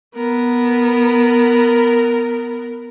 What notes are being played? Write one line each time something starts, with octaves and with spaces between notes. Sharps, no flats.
B3 A#4